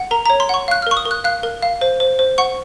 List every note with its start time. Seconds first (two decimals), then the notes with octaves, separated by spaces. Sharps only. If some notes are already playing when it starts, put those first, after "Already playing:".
Already playing: F#5
0.11 A#4 A#5
0.26 A#5
0.30 C#5
0.40 C6
0.49 F#5 C#6
0.68 F5 F#6
0.82 F6
0.87 A#4 C#6
0.97 D#6
1.05 A#4
1.11 F#6
1.24 F5 F#6
1.43 A#4
1.62 F5
1.81 C5
2.00 C5
2.19 C5
2.38 F#5 C#6